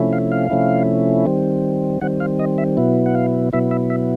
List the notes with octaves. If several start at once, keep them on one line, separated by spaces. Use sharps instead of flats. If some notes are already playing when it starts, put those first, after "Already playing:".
Already playing: C3 F3 A3 C#4 E4
F5
F5
C3 F3 A3 C#4 E4
D#3 G3 C4
D#3 G3 C4 F#5
F5
D#5
E5
B2 F#3 B3 E4
F#5
F5
B2 F#3 B3 E4 E5
E5
E5